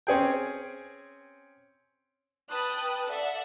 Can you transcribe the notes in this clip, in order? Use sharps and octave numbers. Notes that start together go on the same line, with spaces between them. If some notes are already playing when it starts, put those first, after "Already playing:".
C4 C#4 G#4 G5
B4 G5 A5 D#6 F#6
A4 D5 E5 F#5